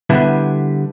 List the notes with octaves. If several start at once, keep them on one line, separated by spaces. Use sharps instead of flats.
D3 G3 B3 E4